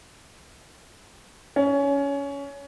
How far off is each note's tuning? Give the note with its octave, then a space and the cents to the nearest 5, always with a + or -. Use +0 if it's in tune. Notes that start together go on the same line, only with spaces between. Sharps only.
C#4 +20